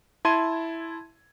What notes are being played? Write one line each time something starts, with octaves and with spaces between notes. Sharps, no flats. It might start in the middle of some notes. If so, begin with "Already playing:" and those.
E4 A5 C6 G#6 D#7